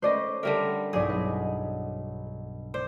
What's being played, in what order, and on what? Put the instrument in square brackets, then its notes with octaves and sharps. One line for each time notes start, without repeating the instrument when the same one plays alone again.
[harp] A3 C#4 B4 [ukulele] C5 D5 D#5
[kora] D3 G3 A#4 [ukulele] E5 F#5
[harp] B1 G2 F#3 [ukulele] D#4 E4 D5 [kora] G#4
[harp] B4 D#5
[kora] C5 [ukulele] D5